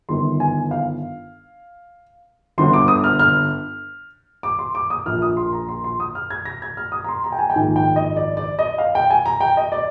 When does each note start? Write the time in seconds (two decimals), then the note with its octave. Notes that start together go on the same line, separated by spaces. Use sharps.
0.09 G1 G2 D#3 C6
0.40 G#5
0.71 F5
2.58 G1 G2 D3 C6
2.73 D6
2.88 D#6
3.04 F6
3.19 F6
4.43 D6
4.59 C6
4.75 D6
4.90 D#6
5.06 A#1 A#2 F6
5.22 D#6
5.37 C6
5.53 A#5
5.69 C6
5.84 C6
6.00 D#6
6.15 F6
6.30 G#6
6.45 A#6
6.62 G#6
6.77 F6
6.92 D#6
7.04 A#5
7.09 C6
7.24 A#5
7.32 G5
7.39 G#5
7.50 G5
7.54 A#1 G#2 D#3 G#5
7.76 G5
7.96 D#5
8.16 D5
8.37 D5
8.59 D#5
8.78 F5
8.95 G5
9.10 G#5
9.26 A#5
9.41 G5
9.57 D#5
9.72 D5